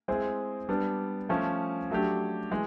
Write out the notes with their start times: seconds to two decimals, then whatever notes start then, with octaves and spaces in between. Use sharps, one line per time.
0.08 G#3 C4 E4 G#4
0.69 G3 B3 D4
1.29 F3 A3 C#4
1.90 F#3 A3 D4 G4
2.51 E3 G#3